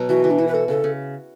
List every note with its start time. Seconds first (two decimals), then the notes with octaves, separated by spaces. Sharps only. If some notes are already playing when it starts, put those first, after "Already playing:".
Already playing: B2 F#3
0.09 E3 F#4
0.24 E3
0.30 D4
0.38 E4 F#4
0.48 B4
0.54 F#4 A4
0.68 C#3 A4
0.84 C#3